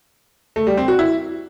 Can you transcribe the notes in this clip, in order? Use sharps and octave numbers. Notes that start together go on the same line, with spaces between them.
A3
G3
C4
F#4
E4